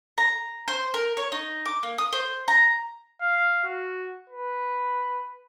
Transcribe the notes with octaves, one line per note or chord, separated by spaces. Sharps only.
A#5
C5
A#4
C#5
D#4
D6
A#3
D#6
C5
A#5
F5
F#4
B4